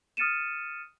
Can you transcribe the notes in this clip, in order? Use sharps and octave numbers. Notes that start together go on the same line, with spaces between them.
D#6 F6 A6 C#7 D#7 E7